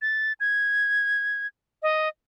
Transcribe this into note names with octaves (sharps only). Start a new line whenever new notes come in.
A6
G#6
D#5